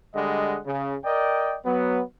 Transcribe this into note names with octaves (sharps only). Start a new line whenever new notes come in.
D3 G3 G#3 D#5 F#5
C#3
A#4 D5 D#5 G5
F#3 B3